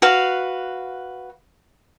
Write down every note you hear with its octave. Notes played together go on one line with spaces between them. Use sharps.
F#4 B4 F5